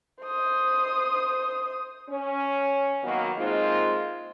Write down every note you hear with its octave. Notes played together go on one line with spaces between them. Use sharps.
C5 D#6
C#4
D#3 F#3 A#3 B3 F#4
G#3 A#3 C4 D#4 F4